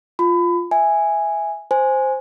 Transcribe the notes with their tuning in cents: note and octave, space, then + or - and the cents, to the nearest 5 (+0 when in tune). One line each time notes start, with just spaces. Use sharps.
F4 +0 B5 +30
E5 +0 G#5 -5
C5 +0 G#5 +0